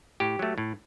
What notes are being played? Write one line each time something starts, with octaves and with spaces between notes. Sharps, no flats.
A2 G4
F#3 A3
A2